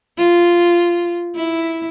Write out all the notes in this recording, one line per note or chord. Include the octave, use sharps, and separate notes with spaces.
F4
E4